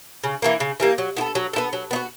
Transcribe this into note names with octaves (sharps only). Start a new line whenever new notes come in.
C#3
E3 G3 A#3
C#3
E3 G3 A#3
F#3
B3 E4 A4
F#3
B3 E4 A4
F#3
B3 D#4 F#4